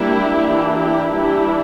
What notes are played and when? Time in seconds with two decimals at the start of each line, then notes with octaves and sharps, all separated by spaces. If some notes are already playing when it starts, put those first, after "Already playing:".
Already playing: G3 A#3 D4 E4 G4
0.41 E3 A#3 D4
0.75 E4 G4
1.11 E3 G3 D4 E4 G4